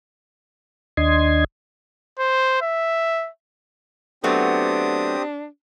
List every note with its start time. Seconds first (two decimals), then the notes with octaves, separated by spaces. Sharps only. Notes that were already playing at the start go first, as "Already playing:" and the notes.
0.97 D#2 D4 D#5 C6 G#6
2.19 C5
2.61 E5
4.24 F#3 A3 B3 C4 D4 G4 D#6